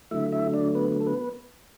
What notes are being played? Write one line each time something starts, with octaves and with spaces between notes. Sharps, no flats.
D3 F#3 A3 E4 E5
E4 E5
D4 D5
B3 B4
A4
B3 B4